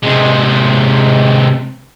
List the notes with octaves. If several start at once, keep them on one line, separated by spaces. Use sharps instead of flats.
C3 G#3